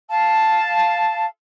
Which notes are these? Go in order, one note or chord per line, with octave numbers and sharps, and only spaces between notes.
F5 A5